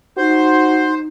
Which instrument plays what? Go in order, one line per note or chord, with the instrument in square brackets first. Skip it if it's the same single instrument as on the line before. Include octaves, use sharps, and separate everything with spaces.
[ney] D#4 [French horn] F#4 [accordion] C5